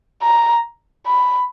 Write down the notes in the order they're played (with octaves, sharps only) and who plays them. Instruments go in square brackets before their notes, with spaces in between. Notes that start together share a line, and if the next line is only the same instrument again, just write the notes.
[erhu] A#5
B5